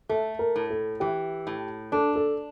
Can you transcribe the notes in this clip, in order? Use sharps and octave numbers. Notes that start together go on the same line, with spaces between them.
A3 A4
A#4
A2
A4
E3 G4
A2
D4 A4
A4